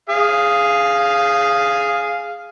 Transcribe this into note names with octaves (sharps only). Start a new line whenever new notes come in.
G#4 F5